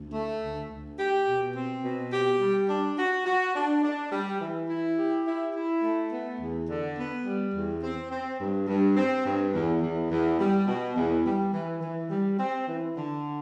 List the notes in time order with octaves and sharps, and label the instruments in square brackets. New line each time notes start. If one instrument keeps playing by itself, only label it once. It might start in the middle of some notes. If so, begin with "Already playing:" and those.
Already playing: [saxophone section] D2
A3
D2
D2
G4
B2
C4
B2
G4
G3
D4
F#4
F#4
D4
D4
G3
E3
E4
G4
E4
E4
A3
B3
E2
D3
B3
G3
E2
C4
C4
G2
G2
C4
G2
E2
E2
E2
G3
B2
E2
G3
E3
E3
G3
C4
E3
D3